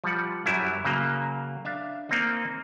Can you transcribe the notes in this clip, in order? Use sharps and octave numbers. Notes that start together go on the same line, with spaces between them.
F3 G3 F#5
F#2 F#3 G3 E4
C#3 F#3 A#3
D4 E5 F5
A#3 C4 D#4